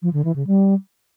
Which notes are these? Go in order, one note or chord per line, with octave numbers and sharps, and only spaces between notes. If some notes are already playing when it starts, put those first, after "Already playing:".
F3
D3
E3
C#3
G3